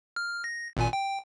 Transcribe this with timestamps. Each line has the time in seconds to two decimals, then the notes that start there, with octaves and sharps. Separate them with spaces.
0.16 F6
0.44 A#6
0.77 G#1 A#2 G#5
0.93 G5